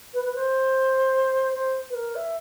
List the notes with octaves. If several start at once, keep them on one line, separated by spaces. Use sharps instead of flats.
B4
B4
C5
C5
B4
A#4
E5